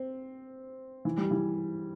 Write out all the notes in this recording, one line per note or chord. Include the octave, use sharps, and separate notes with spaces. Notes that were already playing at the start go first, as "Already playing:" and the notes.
Already playing: C4
E3
G3
E3